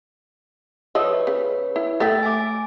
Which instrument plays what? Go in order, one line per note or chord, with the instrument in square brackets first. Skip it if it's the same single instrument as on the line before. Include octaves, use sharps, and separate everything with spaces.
[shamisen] F3 D#5 E5 [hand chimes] B4 C#5
[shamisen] C#3
E4
[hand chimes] A3 A6 [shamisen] A4 E5 G5
[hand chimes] G#5 D6